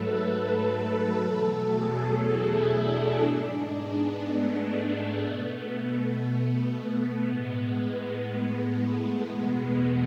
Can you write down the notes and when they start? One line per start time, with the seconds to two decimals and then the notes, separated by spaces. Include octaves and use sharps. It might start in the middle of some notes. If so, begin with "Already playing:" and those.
Already playing: G#2 F#3 A3 A4 B4
0.71 A4
1.20 E2 B2 F#3 A3
1.70 G#4
2.20 E4
2.70 D4
3.20 G#2 G#3
3.70 B3
4.20 A3
4.71 B3
5.20 B2 A3 B3
7.22 A2 G#3 B3
8.21 B3
8.71 A3
9.22 E2 B2 G#3 B3
9.72 A3